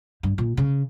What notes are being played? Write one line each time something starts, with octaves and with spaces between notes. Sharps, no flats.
G2
A#2
C#3